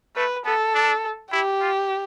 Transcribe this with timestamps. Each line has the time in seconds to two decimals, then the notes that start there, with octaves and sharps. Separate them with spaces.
0.16 A3 B4
0.45 B3 A4
0.75 D4
1.32 E4 G4
1.61 F4